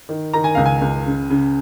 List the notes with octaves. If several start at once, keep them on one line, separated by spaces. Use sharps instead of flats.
D#3
D#3 A#5
G#5
C#2 F5
G#5
C#2
C#3
C#3